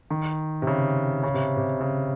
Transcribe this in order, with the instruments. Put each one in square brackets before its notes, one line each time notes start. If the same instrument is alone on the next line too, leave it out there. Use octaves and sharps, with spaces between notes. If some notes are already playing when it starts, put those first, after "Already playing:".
[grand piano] D#3
C3
C#3
C#3
C3
C3
C#3